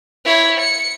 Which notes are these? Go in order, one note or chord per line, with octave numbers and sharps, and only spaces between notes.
E4 C#5
C#7